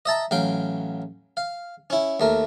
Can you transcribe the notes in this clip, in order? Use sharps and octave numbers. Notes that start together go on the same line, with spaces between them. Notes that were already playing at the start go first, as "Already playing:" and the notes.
D#5 E5 A5 A#5
A1 F#3 F5 G5
F5
C#4 E4
D#2 A3 A#4